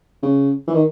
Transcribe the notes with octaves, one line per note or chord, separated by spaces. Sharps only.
C#3
E3
D#3